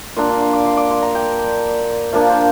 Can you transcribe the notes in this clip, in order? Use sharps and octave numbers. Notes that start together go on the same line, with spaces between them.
A#2 A#3 D4 C6
C6
C6
D6
C6
D6
C6
A#5
G5
F3 A#3 D4 F5
C5